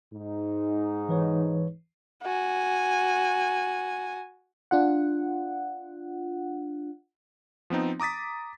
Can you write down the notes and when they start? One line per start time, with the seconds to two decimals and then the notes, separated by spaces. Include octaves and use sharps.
0.14 G#2 D#4
1.09 E3 B4 C#5
2.22 F#4 G#5
4.71 D4 F4 F#5
7.70 F3 B3 C4 D#4
8.00 A#5 D6 D#6 A6 B6